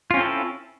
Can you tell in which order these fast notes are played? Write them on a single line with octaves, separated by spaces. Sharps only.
F4 C#4 C4 A4 E4